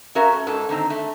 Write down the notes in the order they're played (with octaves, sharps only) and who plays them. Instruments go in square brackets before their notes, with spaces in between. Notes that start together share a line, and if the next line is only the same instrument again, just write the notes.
[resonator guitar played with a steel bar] C#4 F#4 A#4 E5 F5
A3
G#2 C#4 A4
D3 D#3 C4 D#4
A3